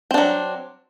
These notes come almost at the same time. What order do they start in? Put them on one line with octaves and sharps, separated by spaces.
C4 D4 F#3